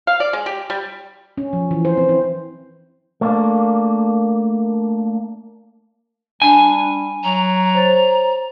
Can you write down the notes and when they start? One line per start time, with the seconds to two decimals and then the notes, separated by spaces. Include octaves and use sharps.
0.07 F5
0.20 D5
0.33 G#3
0.46 G4
0.70 G3
1.37 C#4
1.53 F3
1.71 E3
1.85 C5
1.97 C4
2.09 E4
3.21 A3 A#3 D4
6.42 G3 D4 G#5
7.24 F#3 A#5
7.75 C5 C#5 A6